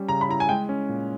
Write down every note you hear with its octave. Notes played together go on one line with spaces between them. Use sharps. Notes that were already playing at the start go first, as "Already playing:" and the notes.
Already playing: G3 C#4
C#3 A#5
B5
E4 A#5
G#5
G#3 G5
C#4
A#2